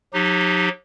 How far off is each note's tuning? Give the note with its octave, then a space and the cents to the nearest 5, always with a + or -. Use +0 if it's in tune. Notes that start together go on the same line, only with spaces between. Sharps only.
F#3 -45 D#4 -20 G4 -5